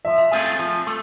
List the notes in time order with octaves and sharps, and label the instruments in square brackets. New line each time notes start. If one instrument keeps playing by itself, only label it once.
[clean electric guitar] F3 [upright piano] E5
[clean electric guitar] A3 C4 F4 G#4
F3
A3